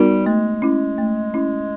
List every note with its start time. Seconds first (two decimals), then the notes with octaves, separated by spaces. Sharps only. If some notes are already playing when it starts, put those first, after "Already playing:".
Already playing: G3 B3 D#4 F#4 A#4
0.26 G#3 A3
0.62 C#4 E4
0.98 A3
1.34 C#4 E4